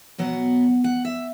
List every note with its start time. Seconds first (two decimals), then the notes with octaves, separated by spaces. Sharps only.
0.18 B2 F#3 B3 F#5
0.84 F#5
1.05 E5